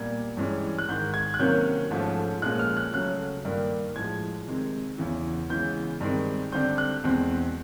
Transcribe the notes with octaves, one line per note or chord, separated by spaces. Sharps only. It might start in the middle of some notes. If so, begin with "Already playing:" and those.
Already playing: A#2 G3 B3 G#6
G2 E3 G#3 C#4
F#6
G#2 D#3 G#3 G6
G#6
F#6
C3 D#3 F#3 A#3 C#4 G6
G#2 F3 A3 C#4
A#2 F3 G#3 C#4 F#6
F6
F#6
C#3 F#3 A3 C#4 F#6
G2 D#3 G3 A#3
A2 F3 G#3 G#6
C3 D#3 G#3 C4
E2 C#3 E3
C#3 E3 G#3 B3 G6
G2 D#3 G#3 C4
D3 G3 C4 G6
F#6
E2 B2 G#3 C4